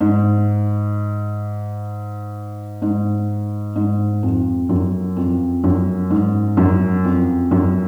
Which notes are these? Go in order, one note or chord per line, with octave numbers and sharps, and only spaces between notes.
G#2
G#2
G#2
F2
F#2
F2
F#2
G#2
F#2
F2
F#2